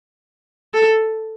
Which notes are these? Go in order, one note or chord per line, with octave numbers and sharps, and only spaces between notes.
A4